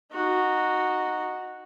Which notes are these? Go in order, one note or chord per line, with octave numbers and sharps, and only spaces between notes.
D#4 F#4